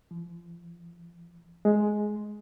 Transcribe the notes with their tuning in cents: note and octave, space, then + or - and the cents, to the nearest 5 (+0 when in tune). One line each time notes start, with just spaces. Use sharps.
F3 -35
G#3 +10